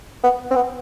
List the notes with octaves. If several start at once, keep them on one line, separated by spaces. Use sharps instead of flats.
B3
C4
B3